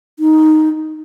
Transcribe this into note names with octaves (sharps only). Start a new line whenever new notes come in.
D#4